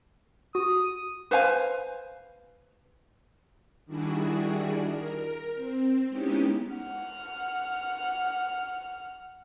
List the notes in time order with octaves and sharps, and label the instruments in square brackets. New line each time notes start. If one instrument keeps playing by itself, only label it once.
[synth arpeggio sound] F#4 [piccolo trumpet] D#6
[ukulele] B4 C5 F5 G#5
[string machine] D#3 G3 D4 E4 F#4 G#4
A#4
C4
G#3 B3 C#4 D#4 E4 G4
[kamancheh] F#5 F6